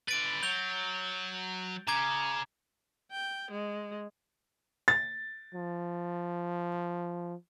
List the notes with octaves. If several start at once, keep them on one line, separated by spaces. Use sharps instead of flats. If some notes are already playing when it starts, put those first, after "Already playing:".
D3 B4 A6 D7
F#3 G6 F7 G7
C#3 A#5 D6 G#6
G5
G#3
A6
F3